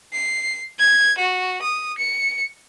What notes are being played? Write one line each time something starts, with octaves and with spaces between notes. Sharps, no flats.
C7
G#6
F#4
D#6
C#7